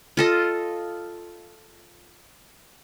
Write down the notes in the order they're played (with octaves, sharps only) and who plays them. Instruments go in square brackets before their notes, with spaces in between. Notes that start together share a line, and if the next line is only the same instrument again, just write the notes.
[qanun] F4 A4 D#5